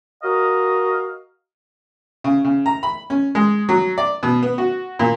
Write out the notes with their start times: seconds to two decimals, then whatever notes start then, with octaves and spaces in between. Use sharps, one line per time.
0.23 F#4 A#4 D#5 F5
2.24 C#3
2.45 C#3
2.66 A#5
2.83 B5
3.10 C#4
3.35 G#3
3.69 F#3
3.98 D5
4.23 B2
4.43 B3
4.58 F#4
4.99 A#2